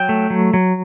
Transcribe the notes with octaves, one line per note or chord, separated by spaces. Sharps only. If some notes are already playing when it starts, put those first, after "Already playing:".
Already playing: F#3 G5
A3
F#3
F#3